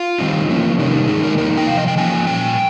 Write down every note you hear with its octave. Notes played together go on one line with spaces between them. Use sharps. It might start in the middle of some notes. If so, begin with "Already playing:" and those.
Already playing: F4
D#3 G3 C4 D#4
F3 A#3 C#4
C3 D#3 G3 A#3 D#4
D#3 G#3 D#4 G#4
A#4
F3 A#3 D#4 A#4
G5
C3 F3 F5
D#5
G5
F3 A#3 C#4 G#5
A#2 G3 G5